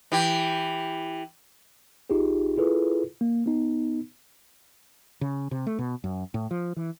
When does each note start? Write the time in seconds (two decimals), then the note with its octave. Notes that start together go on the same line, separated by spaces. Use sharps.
0.12 E3 G4
2.10 A#1 D#4 F4 G4 G#4
2.58 E4 F4 G#4 A4 B4
3.21 A#3
3.46 B3 D#4
5.21 C#3
5.51 C3
5.66 A3
5.79 B2
6.04 F#2
6.34 A2
6.51 F3
6.76 E3